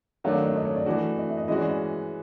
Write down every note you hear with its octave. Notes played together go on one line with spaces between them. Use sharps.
D#3 F#3 A3 D4 F#5
F5
D#5
D5
D#5
C#5
D5
E3 A3 D4 F#4
D#5
E5
D#5
E3 G#3 C#4 F#4 D#5
D5
D#5